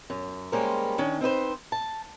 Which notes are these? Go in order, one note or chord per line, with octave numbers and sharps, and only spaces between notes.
F#2
G3 G#3 A#3 C#4 A#4 C5
D#3 C#4 D4
C4 D#4 B4 C5
A5